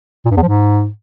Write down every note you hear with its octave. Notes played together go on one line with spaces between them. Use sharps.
A#2
G2
E2
F3
G#2